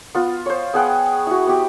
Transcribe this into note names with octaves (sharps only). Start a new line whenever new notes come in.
B3 F4
C5 C#5
B3 G#4 F#5 G5
E4 F#4
B3 G4